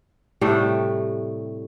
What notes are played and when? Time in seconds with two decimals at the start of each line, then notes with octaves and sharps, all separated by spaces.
0.41 A2 C3 G3 A3